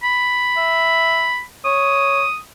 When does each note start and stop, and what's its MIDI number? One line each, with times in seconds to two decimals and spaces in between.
0.03 1.42 83
0.57 1.28 76
1.65 2.24 73
1.65 2.39 87